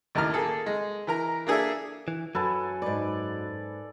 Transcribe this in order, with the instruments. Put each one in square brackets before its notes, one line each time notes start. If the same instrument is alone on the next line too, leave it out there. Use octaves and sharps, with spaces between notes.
[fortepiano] A1 D#2 A2 A#5 F6
A#3 G#4 A4
G#3
E3 A#4 A#5
A#3 D4 G#4 A4 E5
[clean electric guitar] E3
[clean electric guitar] F#2 F#3 [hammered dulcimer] A4 B4 G#5
[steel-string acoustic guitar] G#2 B4 [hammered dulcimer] D5